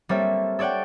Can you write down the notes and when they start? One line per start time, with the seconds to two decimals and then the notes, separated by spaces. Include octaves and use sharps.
0.09 G3 A#3 C4 A4 C#5 E5
0.59 A4 C#5 D5 F#5 G5